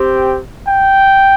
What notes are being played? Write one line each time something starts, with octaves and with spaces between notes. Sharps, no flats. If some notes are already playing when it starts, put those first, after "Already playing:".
Already playing: C4 G4
G5